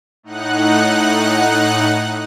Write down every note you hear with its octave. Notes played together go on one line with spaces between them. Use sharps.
A2 D#4 F#5 F#6